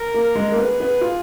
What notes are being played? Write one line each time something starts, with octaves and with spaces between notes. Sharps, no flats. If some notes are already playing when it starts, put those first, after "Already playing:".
Already playing: A#4
A#3
G#3
A#3
B3 G#4
B3
F4